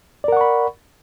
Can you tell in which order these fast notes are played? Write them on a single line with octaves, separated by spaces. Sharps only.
D5 A#4 F#5 C#6 B5